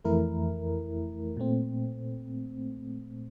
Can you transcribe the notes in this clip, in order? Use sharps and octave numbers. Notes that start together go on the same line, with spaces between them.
F2 E3 A3 E4 A#4
A#2 A3 C4